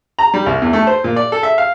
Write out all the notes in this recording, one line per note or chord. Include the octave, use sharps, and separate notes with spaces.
A#5
G3
C2
E2
A3
C5
A#2
D5
A4
E5
F5